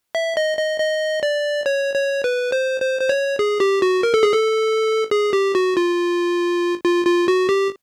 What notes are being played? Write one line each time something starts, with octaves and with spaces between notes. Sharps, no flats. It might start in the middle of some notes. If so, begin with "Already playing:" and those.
E5
D#5
D#5
D#5
D5
C#5
C#5
B4
C5
C5
C5
C#5
G#4
G4
F#4
A#4
A4
G#4
A4
G#4
G4
F#4
F4
F4
F4
F#4
G4